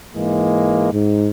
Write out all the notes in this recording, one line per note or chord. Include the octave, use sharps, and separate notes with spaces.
G#2 E3 G#3 A#3
G#2